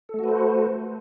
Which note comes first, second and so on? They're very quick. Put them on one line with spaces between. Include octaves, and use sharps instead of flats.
A4 A3 F#4 B4 C5